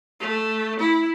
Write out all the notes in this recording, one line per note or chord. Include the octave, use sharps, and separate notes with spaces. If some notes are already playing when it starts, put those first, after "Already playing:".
A3
E4